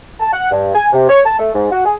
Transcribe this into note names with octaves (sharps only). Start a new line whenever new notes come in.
A5
F#5
G2
G#5
C3
C#5
A5
A3
G#2
F#4
G#4